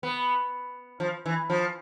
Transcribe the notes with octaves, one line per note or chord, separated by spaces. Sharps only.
B3
F3
E3
F3